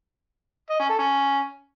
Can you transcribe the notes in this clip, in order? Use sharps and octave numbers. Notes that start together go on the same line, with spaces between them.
D#5
C#4
A4
C#4